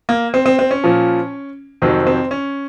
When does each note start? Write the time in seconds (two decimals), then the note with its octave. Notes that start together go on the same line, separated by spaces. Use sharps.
0.09 A#3
0.34 C4
0.46 C4
0.59 C4
0.71 C#4
0.84 A#2 F3
1.82 F2 C3 D#3 F#3 C4
2.07 C4
2.31 C#4